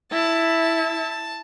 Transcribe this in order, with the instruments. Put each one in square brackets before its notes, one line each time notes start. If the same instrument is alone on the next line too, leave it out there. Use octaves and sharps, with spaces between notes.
[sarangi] E4 [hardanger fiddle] A5